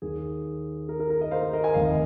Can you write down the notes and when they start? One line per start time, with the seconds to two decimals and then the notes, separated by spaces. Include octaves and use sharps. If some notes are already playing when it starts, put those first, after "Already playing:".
0.02 D#2 D#3 G#4
0.89 A#4
1.00 A#4
1.10 A#4
1.20 A#4 D#5
1.31 C5 F5
1.43 A#4
1.53 A#4 D#5
1.64 G#5
1.74 F1 D#2 D#3 F5
1.85 D#5